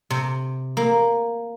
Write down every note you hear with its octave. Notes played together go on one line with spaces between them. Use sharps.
C3
A#3